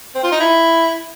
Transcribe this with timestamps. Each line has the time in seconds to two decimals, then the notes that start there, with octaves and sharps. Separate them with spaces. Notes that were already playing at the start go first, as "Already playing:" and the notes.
0.15 C4
0.23 F4
0.32 D#4
0.40 E4